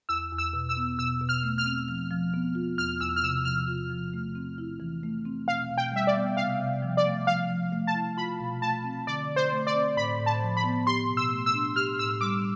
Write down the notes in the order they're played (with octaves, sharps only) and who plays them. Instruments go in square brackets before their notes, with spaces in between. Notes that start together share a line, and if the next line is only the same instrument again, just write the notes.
[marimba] E2 [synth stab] E6
[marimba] E2
[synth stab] E6
[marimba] B2
[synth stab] E6
[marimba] B3
[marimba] B2 [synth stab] E6
[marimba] B2
[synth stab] F6
[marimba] A3
[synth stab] F6
[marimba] C4
F3
F3
B3
F4
[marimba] E2 [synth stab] F6
[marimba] E2 [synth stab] E6
[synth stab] F6
[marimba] C3 [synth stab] E6
[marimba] F3 [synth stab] F6
[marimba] F4
F3
A3
C4
E4
E3
A3
C4
[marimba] B2 [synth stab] F5
[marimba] B2
[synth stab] G5
[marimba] G3 [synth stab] E5
[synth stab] D5
[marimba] B3
[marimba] C3 [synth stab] F5
[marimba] C3
F3
[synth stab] D5
[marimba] A3
[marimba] F3 [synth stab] F5
[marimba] F3
A3
[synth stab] A5
[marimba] E4
[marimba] F4 [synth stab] B5
[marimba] B2
[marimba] A3 [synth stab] A5
[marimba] C4
[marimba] D3 [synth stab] D5
[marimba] D3
[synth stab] C5
[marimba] A3
[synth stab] D5
[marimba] C4
[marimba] A2 [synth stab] B5
[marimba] A2
[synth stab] A5
[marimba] F3
[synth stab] B5
[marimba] B3
[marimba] G4 [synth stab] C6
[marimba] B2
[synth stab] E6
[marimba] A3
[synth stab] E6
[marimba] D4
[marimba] G4 [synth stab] F6
[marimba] A2 [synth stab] E6
[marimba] G3 [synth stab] D6